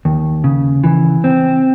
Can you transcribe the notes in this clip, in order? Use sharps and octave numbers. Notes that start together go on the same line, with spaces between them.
D#2
C#3
E3
C4